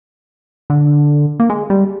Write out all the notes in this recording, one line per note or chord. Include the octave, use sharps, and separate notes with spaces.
D3
A#3
G#3
G3